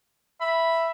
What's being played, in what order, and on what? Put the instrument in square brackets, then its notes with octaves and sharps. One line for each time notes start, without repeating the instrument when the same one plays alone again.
[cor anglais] E5 [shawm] B5